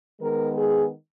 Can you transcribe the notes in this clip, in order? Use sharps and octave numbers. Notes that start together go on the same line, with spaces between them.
D#3 G#3 B3 A#4
G#4